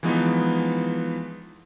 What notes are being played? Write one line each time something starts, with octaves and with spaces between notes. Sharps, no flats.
E3 F3 G#3 B3 D#4